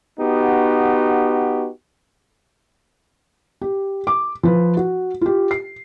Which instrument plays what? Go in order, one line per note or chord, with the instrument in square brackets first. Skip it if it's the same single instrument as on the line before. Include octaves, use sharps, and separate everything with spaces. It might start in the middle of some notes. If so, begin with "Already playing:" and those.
[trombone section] B3 D#4 F#4 G4
[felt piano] G4
D6
F3 B4
F#4
F4 G4
C7